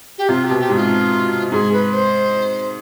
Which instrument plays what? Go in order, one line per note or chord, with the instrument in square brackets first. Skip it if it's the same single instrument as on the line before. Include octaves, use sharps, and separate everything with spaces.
[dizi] G4
[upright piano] C3 [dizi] F4
[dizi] G4
[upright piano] B2
[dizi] G4
[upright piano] G#2
[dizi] F4
[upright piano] G#2 [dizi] G#4
[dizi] B4
C5